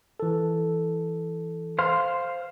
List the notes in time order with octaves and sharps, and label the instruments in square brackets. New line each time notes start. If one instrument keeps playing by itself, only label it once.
[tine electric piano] E3 A4
[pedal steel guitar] C5 F5 C6